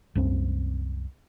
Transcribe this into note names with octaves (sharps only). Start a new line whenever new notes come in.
C2 F#2 C4